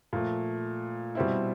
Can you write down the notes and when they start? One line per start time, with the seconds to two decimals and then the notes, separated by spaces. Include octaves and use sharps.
0.13 A#2 F3 A3
1.15 B2 G3 C4 E4